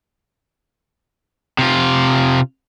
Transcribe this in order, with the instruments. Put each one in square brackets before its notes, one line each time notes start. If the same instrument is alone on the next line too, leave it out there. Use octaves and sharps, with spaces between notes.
[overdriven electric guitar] C3 F4